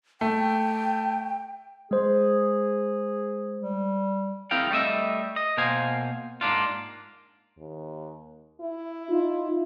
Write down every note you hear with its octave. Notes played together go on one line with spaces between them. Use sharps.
A3 G5
G#3 G#4 C5
G3
C4 E4 G#4 A#4 F5 G5
G3 A3 D#5 E5
D#5
B2 A#3 C5 F5 G#5
G#2 A#3 D4 F4
D#2
E4
D#4 F4